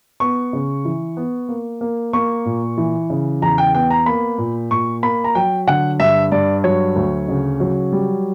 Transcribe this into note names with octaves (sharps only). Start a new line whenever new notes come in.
B3 C#6
C#3
E3
B3
A#3
A#3
A#3 C#6
A#2
E3
C#3
E2 A#5
G5
B3 G5
A#5
A#3 B5
A#2
A#2 C#6
A#3 B5
A#5
F#3 G5
D3 F#5
G2 E5
G2 D5
F#3 C#5
D2
C#3
F#3
G3